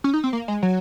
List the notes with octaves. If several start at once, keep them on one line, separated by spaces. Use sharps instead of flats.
C#4
D#4
C4
A#3
G#3
F#3